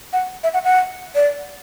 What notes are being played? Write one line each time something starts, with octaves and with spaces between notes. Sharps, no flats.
F#5
E5
F#5
F#5
D5